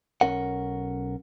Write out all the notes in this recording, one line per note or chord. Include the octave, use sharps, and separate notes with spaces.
B1 C#4 A#4 F#5